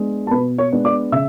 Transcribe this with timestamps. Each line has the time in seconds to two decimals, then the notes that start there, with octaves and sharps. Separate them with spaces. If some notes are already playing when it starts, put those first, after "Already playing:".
Already playing: G#3 B3 D4
0.27 A5
0.31 B2 B4 B5
0.58 C#5 C#6
0.72 G#3 B3 D4
0.85 D5 D6
1.12 C#3 E5 E6